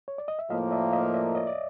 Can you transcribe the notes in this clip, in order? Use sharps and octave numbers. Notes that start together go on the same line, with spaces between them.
C#5
D5
D#5
E5
A2 F3 A#3 D#5 F5
D5 E5
D#5 F5
D5 E5
C#5 D#5
D5